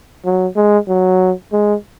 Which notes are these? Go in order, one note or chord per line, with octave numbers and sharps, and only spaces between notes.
F#3
G#3
F#3
G#3